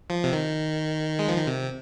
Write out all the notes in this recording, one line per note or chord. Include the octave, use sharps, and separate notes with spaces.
F3
C3
D#3
G#3
F3
D#3
C3